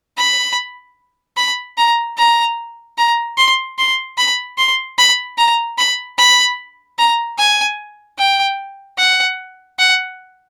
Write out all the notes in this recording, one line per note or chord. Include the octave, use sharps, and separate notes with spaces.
B5
B5
A#5
A#5
A#5
C6
C6
B5
C6
B5
A#5
B5
B5
A#5
G#5
G5
F#5
F#5